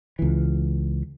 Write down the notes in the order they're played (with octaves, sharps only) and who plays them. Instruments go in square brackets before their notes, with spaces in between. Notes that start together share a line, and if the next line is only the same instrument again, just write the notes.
[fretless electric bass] C#2 E3